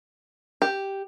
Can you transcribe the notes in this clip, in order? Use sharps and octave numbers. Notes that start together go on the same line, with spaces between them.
G4